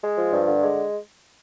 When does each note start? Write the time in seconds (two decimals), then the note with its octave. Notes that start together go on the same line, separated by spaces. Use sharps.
0.02 G#3
0.17 F3
0.31 G2
0.46 D3
0.62 G#3